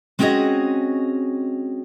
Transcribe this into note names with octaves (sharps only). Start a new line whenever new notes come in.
G#3 C4 C#4 F#4 G#4 D#5